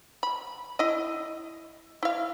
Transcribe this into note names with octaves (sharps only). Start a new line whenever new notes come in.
B5
E4 D#5
E4 F5